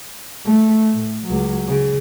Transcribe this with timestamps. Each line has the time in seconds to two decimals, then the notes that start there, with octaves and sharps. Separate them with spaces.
0.45 A3
0.91 A2
1.25 C#2 F#3
1.67 C#3